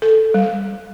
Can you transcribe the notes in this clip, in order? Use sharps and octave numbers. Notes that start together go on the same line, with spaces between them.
A4
G3